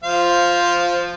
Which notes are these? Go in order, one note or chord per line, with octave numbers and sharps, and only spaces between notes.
F3 C5 F5